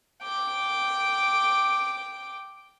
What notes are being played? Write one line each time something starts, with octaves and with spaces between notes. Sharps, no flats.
G5 D6